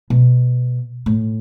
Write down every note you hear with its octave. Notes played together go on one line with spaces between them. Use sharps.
B2
A2